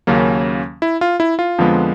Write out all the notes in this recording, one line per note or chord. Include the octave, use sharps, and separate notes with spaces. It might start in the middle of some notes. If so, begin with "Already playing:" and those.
D#2 C#3 F#3 A#3 C#4
E4
F4
E4
F4
F2 D3 F3 G#3 B3